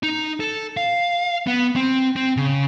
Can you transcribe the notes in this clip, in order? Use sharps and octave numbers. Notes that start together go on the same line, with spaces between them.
D#4
A4
F5
B3
C4
C4
C#3